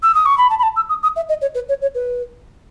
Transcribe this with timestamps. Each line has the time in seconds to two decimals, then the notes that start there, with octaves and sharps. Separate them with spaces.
0.03 E6
0.15 D#6
0.26 C#6
0.38 B5
0.50 A5
0.59 B5
0.63 A5
0.76 E6
0.89 D#6
1.03 D#6
1.16 E5
1.29 D#5
1.42 C#5
1.55 B4
1.69 C#5
1.82 C#5
1.95 B4